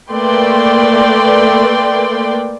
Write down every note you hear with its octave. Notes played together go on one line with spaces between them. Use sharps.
A3 A#3 B4 D5 G5 C6